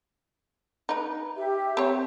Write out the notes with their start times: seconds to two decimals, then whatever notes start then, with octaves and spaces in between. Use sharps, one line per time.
0.89 D#4 B4
1.36 G4 E5
1.77 C4 C#5